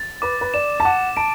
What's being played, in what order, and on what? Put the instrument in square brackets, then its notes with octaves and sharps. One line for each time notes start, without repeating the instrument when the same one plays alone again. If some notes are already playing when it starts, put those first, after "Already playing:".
Already playing: [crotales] A6
[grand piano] B4 [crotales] D6
[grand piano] B4
[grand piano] D5 [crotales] E7
[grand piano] A5
[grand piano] F#5 [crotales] D6
[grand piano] A5 [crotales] D7